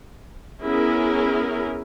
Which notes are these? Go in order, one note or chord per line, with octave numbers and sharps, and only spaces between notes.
B3 C#4 E4 G#4 A#4